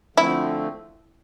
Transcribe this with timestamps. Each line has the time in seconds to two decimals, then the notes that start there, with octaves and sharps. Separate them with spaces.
0.16 D3 F3 A3 C4 E4